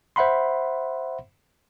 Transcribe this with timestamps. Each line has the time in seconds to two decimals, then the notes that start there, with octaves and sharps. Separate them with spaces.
0.16 C5 E5 F#5 B5 C6